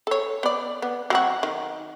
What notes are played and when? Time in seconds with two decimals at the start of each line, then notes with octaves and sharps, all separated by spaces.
0.07 A4 C#5
0.43 B3 D5
0.82 B3
1.10 F#3 C4 F#4
1.43 D#3